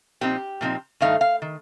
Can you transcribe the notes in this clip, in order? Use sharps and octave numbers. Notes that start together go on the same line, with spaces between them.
A#2 F3 C4 D#4 G4
A#2 F3 C4 D#4
G2 D#3 A3 D#4 F5
F5
D#3